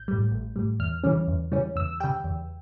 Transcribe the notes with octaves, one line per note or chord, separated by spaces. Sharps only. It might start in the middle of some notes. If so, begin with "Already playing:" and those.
Already playing: A1 G6
A2 G3
A1
A2 G3
E2 F6
C#3 E3 G3 C#4
E2
C#3 E3 G3 C#4
E2 E6
C#3 G3 G5
E2